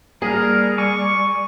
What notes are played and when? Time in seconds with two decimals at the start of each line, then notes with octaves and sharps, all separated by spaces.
0.22 G3 A#3 D4 G#4 A#4
0.78 G#5 C#6 D6 E6